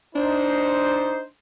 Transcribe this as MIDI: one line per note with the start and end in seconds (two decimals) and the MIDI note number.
0.16 1.27 62
0.16 1.21 63
0.16 1.21 72